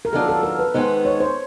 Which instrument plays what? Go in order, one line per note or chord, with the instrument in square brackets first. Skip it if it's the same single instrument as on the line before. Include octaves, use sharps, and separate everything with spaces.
[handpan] A#4
[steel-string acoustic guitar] D#3 F#3 B3 D4 F4 [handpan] A4
[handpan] A4
A#4
B4
[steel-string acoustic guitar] D#3 G#3 B3 D#4 [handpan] C5
[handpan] C#5
C5